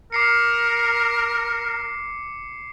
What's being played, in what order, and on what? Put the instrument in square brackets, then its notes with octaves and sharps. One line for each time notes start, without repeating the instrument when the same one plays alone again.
[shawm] A#4 [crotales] D6 C7 C#7